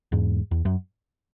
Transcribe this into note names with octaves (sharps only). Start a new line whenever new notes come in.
E2 G#2
E2
F#2